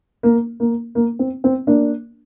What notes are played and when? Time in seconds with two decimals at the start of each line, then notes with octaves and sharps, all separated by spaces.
0.23 A#3
0.60 A#3
0.95 A#3
1.19 C4
1.44 C4
1.67 A#3 D4